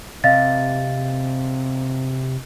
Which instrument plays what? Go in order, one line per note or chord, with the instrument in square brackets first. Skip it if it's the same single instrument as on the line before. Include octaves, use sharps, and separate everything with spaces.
[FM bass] C3 [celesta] D#5 F5 A6